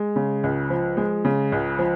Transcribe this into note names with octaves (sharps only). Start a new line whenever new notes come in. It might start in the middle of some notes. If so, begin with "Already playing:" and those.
Already playing: G#3
C#3
C#2
F3
G#3
C#3
C#2
F3